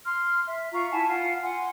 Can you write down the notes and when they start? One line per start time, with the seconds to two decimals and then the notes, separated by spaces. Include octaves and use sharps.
0.05 C6 F6
0.46 E5
0.73 F4 A#5 C#6
0.90 E4 F#5 G#5 A5
1.09 F4 F#5
1.42 F#5 G#5 C6